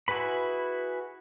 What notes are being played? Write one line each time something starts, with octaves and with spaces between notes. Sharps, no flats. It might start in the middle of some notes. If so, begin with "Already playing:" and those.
E4 F#4 G#4 B4 B5